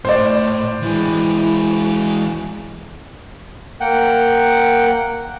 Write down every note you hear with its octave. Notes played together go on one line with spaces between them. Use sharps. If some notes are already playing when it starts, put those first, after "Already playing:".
A2 C5 D5
E3 G#3 E4
A#3 F#5 G5